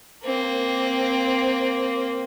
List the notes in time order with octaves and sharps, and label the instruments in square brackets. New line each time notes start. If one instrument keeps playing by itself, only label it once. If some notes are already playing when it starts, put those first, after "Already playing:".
[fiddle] A#3 C4